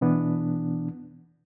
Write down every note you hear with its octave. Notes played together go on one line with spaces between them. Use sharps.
B2 E3 B3 D4